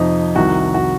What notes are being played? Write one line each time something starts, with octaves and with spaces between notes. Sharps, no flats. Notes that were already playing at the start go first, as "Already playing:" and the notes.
Already playing: F2 C3 F3 D#4
C2 C3 D#3 F#4
F#4